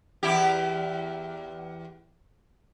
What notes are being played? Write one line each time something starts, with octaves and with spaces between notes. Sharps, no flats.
E2 E4 G4